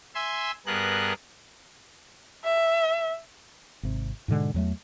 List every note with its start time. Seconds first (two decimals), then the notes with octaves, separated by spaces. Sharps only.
0.15 E5 G#5 C6 E6
0.66 G2 B3 G#4 A#4 F#6
2.45 E5
3.83 G#1 C3
4.28 G#2 B2 D3 G#3
4.54 E2 F#3 A3